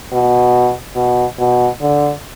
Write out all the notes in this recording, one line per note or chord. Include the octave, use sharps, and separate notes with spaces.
B2
B2
B2
D3